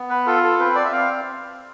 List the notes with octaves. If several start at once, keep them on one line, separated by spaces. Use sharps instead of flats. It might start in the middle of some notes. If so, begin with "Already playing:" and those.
Already playing: B3
B4
F4 A4
A4
C4 B4
D5
E5
C4 F5